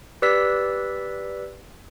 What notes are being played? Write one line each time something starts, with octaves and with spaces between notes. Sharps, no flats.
G4 B4 D5 E6 B6